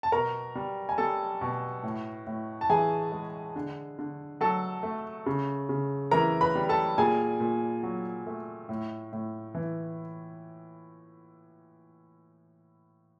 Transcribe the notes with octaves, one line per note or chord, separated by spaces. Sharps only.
A5
B2 A#4 A#5
G3
G#5
G3 A4 A5
B2
A2
A2
A5
E3 G#4 G#5
G#3
D3
D3
F#3 A4 A5
A3
C#3
C#3
E3 A#4 A#5
B4 B5
G3
A4 A5
A#2 G#4 G#5
A#2
F#3
A3
A2
A2
E3